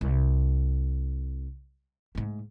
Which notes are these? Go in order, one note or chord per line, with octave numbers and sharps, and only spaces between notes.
C2
G#2 A3